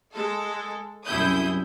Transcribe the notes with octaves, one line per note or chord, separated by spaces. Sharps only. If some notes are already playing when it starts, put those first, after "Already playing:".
G#3 A4
C2 F#2 E4 D#6 G6